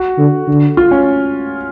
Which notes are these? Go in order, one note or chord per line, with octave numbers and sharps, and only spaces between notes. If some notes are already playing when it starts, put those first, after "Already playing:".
Already playing: F#4
D3
D3
F4
C#4